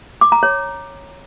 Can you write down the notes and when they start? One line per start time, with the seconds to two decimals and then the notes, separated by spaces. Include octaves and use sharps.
0.21 D6
0.32 A#5
0.43 C#5